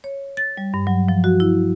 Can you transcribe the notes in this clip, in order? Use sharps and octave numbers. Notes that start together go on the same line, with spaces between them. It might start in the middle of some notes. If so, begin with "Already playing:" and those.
C#5
A6
G3
G2
F#3
F3
F#4
E4